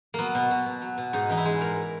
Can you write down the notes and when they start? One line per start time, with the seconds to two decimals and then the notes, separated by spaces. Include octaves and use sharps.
0.14 F#3 A#3 B3
0.35 B2
0.50 B2
0.66 B2
0.81 F#3
0.98 B2
1.13 G#2 D#4
1.29 E3 D#4
1.37 E4
1.45 G#3
1.61 G#2 A#4